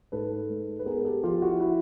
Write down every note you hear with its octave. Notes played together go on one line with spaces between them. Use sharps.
G#2 A4 B4
G#3
B4
B3 G#4 A#4
G4 A4
F3 F4 G4
E4 F#4
E4 F#4